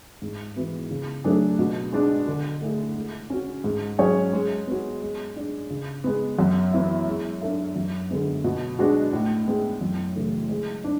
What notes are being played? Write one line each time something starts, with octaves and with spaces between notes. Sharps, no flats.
G#2
E3 B3 F#4
C#3
F#3 A3 D4 G#4
B2
G#3 D4
D3
A3 E4 G#4
G#3
C#4 F#4
G#2
F#3 C#4 G#4 C#5
G#3
B3 F#4
G#3
D4 G#4 D5
C#3
G#3 B3
F#2
E3 B3 E4
G#3
D4 A4 E5
F#2
D3 G#3 B3
B2
G#3 D4 F#4
A2
G#3 B3
F#2
C#3 E3 A3
G#3
D4